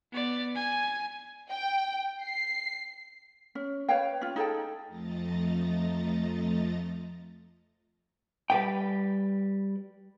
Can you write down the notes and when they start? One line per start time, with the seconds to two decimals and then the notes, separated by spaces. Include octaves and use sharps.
0.12 B3 D5
0.56 G#5
1.51 G5
2.23 C7
3.55 C#4
3.89 B4 C#5 F5 G5
4.21 C#4 F4
4.36 D#4 G#4 A4 G5
4.87 F2 F3 A3 D#5 A#5 A6
8.50 G3 B4 G5